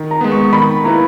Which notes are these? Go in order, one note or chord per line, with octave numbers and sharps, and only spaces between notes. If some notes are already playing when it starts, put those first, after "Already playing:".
Already playing: D#3
A#5
G#3 B3
C#6
D#3 B5
A#3 E4 B4 A#5